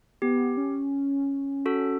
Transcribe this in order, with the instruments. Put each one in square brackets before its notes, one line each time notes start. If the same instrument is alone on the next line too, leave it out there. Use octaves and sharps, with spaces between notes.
[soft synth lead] B3 [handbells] G4
[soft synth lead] C#4
[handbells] F#4 A4